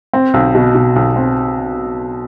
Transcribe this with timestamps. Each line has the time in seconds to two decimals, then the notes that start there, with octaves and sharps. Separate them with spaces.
0.14 C4
0.34 B1
0.55 B2
0.75 B2
0.96 B1
1.16 C4